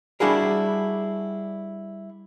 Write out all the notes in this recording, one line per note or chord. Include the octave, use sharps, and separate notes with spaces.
G3 D4 E4 F#4 G#4 A#4